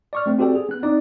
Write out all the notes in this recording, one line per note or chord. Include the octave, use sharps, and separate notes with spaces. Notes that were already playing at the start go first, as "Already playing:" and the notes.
D5 C#6 F6
A3 C4
C4 F#4 G4 A4 D5 G5
G#4
B3 F#6
C4 D#4 D5